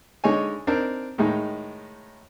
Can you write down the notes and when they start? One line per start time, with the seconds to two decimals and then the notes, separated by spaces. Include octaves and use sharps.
0.24 D3 G#3 D#4 C#5 G#5
0.67 C4 D4 D#4 A#4
1.18 A2 D#3 G#3 D#4